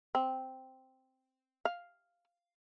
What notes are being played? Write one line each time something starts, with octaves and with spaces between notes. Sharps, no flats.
C4
F5